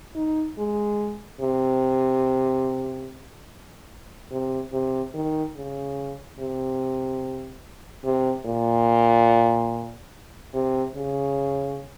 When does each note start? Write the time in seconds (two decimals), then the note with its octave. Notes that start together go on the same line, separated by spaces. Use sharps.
0.15 D#4
0.58 G#3
1.40 C3
4.31 C3
4.73 C3
5.14 D#3
5.55 C#3
6.39 C3
8.04 C3
8.46 A#2
10.54 C3
10.95 C#3